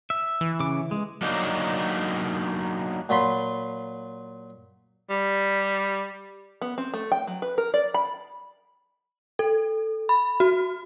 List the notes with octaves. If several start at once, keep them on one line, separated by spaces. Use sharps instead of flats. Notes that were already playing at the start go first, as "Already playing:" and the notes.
E5
E3
C#3 D6
G#3
F#3 A#3 D4 D#4
A#2 F#3 F4 B5 C6
G3
B3
C4
A3
G5
F#3
B4
A#4
D5
B5
A4
B5
F#4